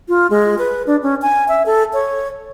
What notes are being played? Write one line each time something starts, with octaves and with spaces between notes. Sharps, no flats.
F4
G#3
B4
D4
C#4
G#5
E5
A4
C#5